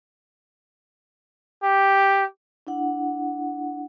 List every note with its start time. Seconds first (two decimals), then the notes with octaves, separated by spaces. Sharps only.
1.63 G4
2.67 D4 E4 F#5